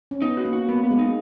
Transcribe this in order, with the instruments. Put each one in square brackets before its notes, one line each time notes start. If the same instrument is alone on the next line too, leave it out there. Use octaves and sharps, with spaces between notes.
[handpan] C#4
[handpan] B3 [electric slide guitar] D#4
[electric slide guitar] F#4
[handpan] A#3
[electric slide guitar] F#4
[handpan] A#3 [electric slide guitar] B3
[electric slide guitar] B3
[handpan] G#3
[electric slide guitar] D#4